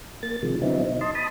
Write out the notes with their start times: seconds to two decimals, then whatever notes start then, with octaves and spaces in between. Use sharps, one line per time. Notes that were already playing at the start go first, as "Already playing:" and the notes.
0.23 A#3 A6
0.43 C3 D#3 F3 G#3
0.62 D3 F#3 B3 C4 D#4 E4
0.81 B2 D#4
1.01 D#5 A5 C6
1.15 A5 B5 D#6